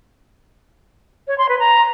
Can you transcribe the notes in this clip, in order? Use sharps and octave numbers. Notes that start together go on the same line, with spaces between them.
C#5
C6
B4
A#5